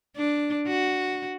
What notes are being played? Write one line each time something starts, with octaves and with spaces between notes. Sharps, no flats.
D4
F#4